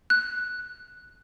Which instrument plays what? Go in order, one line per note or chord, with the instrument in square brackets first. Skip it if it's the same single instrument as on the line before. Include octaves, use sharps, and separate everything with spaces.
[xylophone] F#6